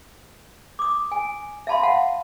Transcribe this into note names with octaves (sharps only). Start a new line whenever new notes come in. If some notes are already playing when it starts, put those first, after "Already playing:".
D6 D#6
G#5
E5 F5 A5 B5 C6
F5 F#5 A5